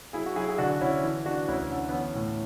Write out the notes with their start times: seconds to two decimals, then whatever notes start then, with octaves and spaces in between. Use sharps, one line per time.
0.13 F#3 E4 G#4
0.26 F#4
0.36 F#3 E4 G#4
0.48 G#4
0.58 D3 D4 F#4
0.81 D3 C#4 E4
1.04 E3
1.26 E3 D4 F#4
1.48 D2 C#4 E4
1.70 D3 C#4
1.89 B3
1.93 E3 C#4
2.15 A2